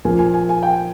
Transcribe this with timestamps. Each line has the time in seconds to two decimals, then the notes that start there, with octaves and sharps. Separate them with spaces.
0.05 A#2 F3 A#3 G#5
0.19 G#5
0.34 G#5
0.49 G#5
0.63 G5